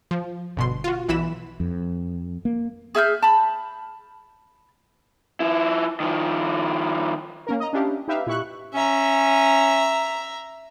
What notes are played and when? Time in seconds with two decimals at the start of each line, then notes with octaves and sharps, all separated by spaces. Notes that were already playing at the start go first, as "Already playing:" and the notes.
0.11 F3
0.57 G1 B2 C6
0.84 F4 F#4
1.08 B1 E3 E4 B5 E7
1.60 F2
2.45 A#3
2.95 G#4 E5 F6 G6
3.23 A5 B5
5.40 F3 E4
6.00 D#3 F3
7.47 A#3 C#4 A#4
7.60 D#5 A#5
7.73 C#4 D4 E4 G4 F5
8.08 D#4 G4 B4 E5 F5
8.26 A#2 E4 G4 E5 C#6 F#6
8.74 C#4 E5 A#5